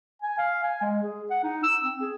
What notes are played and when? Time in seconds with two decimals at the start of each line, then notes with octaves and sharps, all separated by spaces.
0.22 G#5
0.38 F5
0.63 G#5
0.81 G#3
1.03 G#4
1.30 F#5
1.43 D#4
1.63 E6
1.83 C4
2.01 G#4